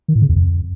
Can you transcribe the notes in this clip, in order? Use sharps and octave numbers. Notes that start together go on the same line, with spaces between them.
D#3
A2
C#3
E2
F2